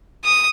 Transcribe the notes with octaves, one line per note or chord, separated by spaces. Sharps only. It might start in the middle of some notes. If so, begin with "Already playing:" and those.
D#6